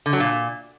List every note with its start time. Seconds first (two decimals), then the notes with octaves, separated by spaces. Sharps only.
0.06 D3
0.13 F#3
0.20 A#2